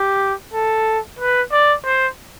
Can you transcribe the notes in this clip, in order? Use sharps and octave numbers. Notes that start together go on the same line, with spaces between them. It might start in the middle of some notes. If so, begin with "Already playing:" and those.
Already playing: G4
A4
B4
D5
C5